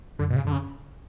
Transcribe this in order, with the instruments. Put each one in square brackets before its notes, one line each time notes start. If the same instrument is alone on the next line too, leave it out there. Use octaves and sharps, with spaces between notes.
[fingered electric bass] F#2 [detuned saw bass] D3
[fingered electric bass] G#2 [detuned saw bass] B2
[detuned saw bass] C#3
[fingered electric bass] F#2 [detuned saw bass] D3
[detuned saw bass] C#3